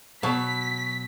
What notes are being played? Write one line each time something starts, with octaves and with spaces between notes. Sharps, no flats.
B2 F#3 B6